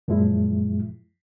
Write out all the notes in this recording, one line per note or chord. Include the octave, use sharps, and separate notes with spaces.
F#2 A#2 F3 G#3 E4